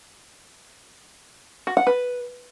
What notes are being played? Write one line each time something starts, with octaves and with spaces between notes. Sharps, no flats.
F#4
F#5
B4